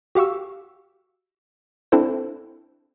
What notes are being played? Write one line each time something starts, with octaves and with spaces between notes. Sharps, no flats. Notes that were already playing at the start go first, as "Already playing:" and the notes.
F#4 G4 F5 C#6 E6
C4 D4 E4 A4 C5